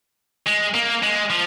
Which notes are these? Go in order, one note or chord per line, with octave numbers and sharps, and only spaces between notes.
G#3
A#3
G#3
F3